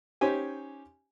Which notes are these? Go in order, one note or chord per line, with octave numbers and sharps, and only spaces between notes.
C#4 D#4 G4 C5 G#5